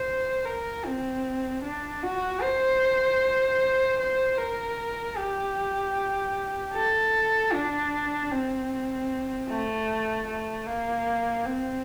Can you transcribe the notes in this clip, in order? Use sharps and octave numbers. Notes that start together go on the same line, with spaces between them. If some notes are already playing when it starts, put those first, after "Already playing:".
Already playing: C5
A#4
C4
D4
F#4
C5
C5
A#4
G4
A4
D4
C4
A3
A3
A#3
C4